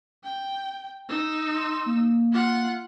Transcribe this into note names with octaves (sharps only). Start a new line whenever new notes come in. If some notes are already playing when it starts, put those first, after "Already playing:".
G5
D#4 E6
C6
A#3
F4 F#5